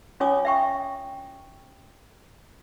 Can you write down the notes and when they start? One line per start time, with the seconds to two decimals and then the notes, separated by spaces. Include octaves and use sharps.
0.20 C#4 F4 C#5 G#5 D6 D#6
0.45 E5 G5 C#6